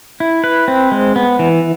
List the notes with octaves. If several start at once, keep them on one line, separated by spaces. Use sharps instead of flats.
E4
B4
C4
G#3
B3
E3